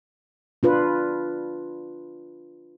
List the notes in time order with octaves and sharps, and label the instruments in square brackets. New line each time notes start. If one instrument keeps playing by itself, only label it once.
[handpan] D4 F4 B4